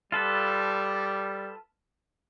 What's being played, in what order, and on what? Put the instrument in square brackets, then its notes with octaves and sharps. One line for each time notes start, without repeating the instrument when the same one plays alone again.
[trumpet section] G3 [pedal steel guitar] F4 A4 B4